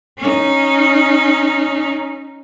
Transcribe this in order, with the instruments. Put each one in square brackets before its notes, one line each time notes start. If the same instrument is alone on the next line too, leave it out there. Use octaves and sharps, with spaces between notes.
[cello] C#4 D#4